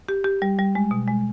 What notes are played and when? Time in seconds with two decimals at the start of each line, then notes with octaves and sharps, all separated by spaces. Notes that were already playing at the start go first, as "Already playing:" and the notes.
0.09 G4
0.24 G4
0.42 G3
0.58 G3
0.75 G#3
0.91 B2
1.08 G#3